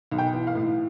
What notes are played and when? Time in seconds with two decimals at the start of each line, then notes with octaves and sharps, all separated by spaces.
0.11 B1
0.18 G5
0.33 E3
0.47 F5
0.55 A2